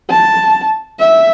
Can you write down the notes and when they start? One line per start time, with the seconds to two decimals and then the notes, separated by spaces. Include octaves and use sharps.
0.11 A5
1.00 E5